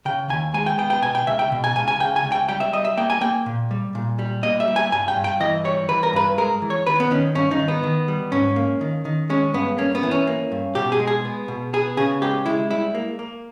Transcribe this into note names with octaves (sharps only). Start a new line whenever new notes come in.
C#3 G5
D#2 G#5
G#3 G#5
G5
B3 G5
G5
B2 G#5
G5
C#2 E5
G5
B2
G#5
C#2 G#5
G#5
C#3 G5
G#5
C#2
G5
G3 G5
E5
G3 D#5
E5
A#3 G5
G#5
A#3 G5
A#2
G3
A#2
G3
A#3 D#5
E5
G3
G#5
G2 G#5
G5
G2
G5
E3 D#5
G3 C#5
E3 B4
A#4
G2 B4
G#3 A#4
E3
C#5
D#3 B4
B3
D#3 C#4
G2 C#4
D#4
D#3
B3
D#3
G3
G#2 C#4
A#3
D#3
D#3
G#3 C#4
G2 B3
A#3 C#4
B3
E3
C#4
A#3
G2
B2 G4
G#4
G#3
G#4
B3
B2
B3 G#4
C#3 G#4
G#3 G4
G#3 E4
G3 E4
A#3
A#3